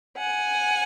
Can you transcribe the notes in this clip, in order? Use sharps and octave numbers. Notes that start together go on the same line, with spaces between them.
F#5 G#5